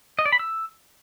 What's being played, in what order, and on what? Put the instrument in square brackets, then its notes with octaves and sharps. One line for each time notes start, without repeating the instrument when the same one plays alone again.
[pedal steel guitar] D#5
D5
B5
E6